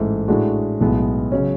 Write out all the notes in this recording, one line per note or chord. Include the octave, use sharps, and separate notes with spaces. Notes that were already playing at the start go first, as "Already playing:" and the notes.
Already playing: A1 G#2 E3 A3 E4
A2 G#3 D4 F#4
B1 A2 G#3 B3
C#3 F#3 C#4